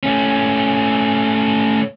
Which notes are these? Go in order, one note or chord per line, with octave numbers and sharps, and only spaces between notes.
A3 C#4